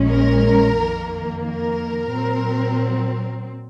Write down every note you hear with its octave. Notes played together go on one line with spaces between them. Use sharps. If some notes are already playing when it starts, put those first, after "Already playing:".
Already playing: A#1 A#2 G#3 C#4
A#4
F2 D#3 A#3
A#4
A#2 F#3 C4